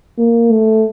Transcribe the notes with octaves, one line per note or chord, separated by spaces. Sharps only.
A#3
A3